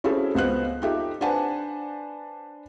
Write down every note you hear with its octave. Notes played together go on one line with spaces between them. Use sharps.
C#4 E4 F#4 G#4 A4 C5
C#2 B3 C5 F#6
D#4 F4 G4 A4 E5
D4 B4 C5 F#5 G#5 A5